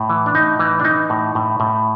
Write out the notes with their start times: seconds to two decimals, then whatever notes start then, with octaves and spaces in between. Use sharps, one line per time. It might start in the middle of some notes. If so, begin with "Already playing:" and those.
Already playing: A2
0.09 E3
0.26 D4
0.35 A2 D#4
0.59 E3
0.80 D4
0.84 E3 D#4
1.10 A2
1.35 A2
1.60 A2